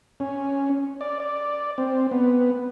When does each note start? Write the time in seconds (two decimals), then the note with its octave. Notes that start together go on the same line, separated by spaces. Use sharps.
0.20 C#4
1.01 D5
1.20 D5
1.78 C4
2.11 B3